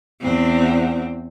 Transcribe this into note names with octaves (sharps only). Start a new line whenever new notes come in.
E2 C4